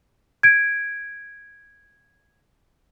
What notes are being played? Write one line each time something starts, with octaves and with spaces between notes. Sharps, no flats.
G#6 D7